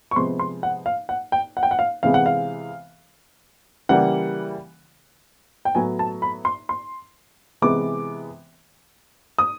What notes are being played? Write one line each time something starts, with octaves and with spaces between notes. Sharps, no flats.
C#6
C3 F3 G#3 B3 C6
C6
F#5
F5
F#5
G5
F#5
G5
F#5
F5
C3 E3 G#3 B3 F5
F#5
F5
C#3 E3 G3 A#3 F#5
G5
A2 F#3 B3 G#5
A5
B5
C6
C6
C3 E3 G#3 B3 D6
D#6